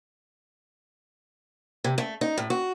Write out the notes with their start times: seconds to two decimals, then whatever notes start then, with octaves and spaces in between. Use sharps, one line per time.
1.84 C3
1.98 A3
2.21 D#4
2.38 A2
2.50 F#4